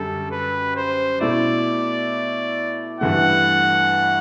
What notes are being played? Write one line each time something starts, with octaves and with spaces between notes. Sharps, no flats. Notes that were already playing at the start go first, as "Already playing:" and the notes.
Already playing: F#2 D3 G3 A4
B4
C5
B2 A3 E4 D5
G2 E3 A3 F#5